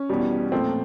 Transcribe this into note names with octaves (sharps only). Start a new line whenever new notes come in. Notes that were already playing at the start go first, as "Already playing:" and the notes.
Already playing: C#4
E2 B2 G3
A#2 F3 A3 C4